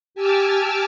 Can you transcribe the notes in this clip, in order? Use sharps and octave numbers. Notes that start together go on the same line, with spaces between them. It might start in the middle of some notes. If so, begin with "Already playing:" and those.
G4 G#5 A5 D6 E6 F6